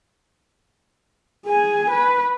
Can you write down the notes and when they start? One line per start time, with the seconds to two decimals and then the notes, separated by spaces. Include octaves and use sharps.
1.46 G#4 G#5
1.91 B4